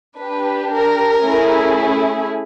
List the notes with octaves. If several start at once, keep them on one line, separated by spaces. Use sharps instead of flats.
D4 G4 B4
A#4
A3 C#4 E4 G#4